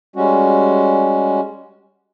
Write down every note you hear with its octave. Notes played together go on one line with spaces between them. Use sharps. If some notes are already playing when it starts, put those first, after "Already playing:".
G3 G#3 C#4 F#4